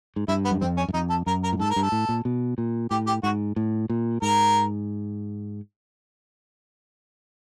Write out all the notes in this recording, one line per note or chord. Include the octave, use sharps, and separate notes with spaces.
G#2
G2 E4
B3
F#2
F2 C4
C#4
F#2
F2 D#4
A4
F#2 A#4
A#4
A2
G#2 A4
A#4
G2
A4
A2
A#2
B2
A#2
A2 G4
G4
G#2 F#4
A2
A#2
G#2 A#4